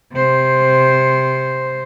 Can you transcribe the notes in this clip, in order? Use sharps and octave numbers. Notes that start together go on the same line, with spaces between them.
C3 C5